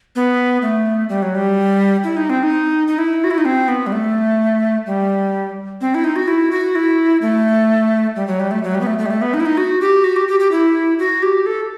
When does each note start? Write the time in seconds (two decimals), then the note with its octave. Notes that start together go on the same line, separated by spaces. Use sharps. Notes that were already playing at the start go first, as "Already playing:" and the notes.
0.16 B3
0.62 A3
1.09 G3
1.22 F#3
1.35 G3
2.04 E4
2.17 D#4
2.30 C4
2.43 D#4
2.88 D#4
2.98 E4
3.24 F#4
3.31 E4
3.38 D#4
3.45 C4
3.68 B3
3.87 G3
3.92 A3
4.86 G3
5.81 C4
5.95 E4
6.04 D#4
6.16 F#4
6.28 E4
6.51 F#4
6.75 E4
7.22 A3
8.16 G3
8.27 F#3
8.40 G3
8.51 A3
8.64 F#3
8.75 G3
8.81 B3
8.87 A3
8.99 A3
9.06 G3
9.10 A3
9.22 B3
9.34 D#4
9.40 E4
9.46 D#4
9.57 F#4
9.81 G4
10.04 F#4
10.16 G4
10.28 G4
10.40 G4
10.52 E4
10.99 F#4
11.23 G4
11.46 A4